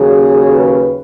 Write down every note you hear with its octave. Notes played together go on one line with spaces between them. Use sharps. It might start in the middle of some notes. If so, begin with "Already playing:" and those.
Already playing: D#2 C#3 F#3 G#4
B4